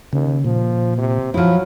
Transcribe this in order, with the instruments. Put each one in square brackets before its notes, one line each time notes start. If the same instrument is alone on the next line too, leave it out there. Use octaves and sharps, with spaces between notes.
[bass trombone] D#2 [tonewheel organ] C#3
[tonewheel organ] A#2 [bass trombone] F3
[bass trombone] C3
[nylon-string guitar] F3 E4 [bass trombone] F#3